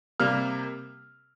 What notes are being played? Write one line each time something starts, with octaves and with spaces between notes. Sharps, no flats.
C3 G3 A#3 F6